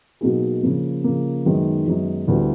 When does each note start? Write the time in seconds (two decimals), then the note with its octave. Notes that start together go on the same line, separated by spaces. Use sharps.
0.21 B2 F#3 A#3 D#4 G#4
0.63 C#3 F3 A#3
1.04 C#3 F3 A#3
1.46 F#2 D#3 G#3 B3 D#4
1.88 F#2 D#3 G#3 B3 D#4
2.28 D2 D3 G3 B3 E4